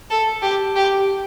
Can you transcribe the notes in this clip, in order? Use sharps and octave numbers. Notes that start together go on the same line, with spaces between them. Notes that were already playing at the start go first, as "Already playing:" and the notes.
A4
G4
G4